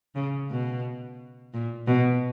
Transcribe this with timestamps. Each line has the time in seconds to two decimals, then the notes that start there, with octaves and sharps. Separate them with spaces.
0.15 C#3
0.51 B2
1.54 A#2
1.87 B2